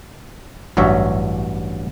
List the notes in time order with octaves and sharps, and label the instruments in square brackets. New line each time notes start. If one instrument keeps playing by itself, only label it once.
[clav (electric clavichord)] A1 G2 F#3 C#5 E5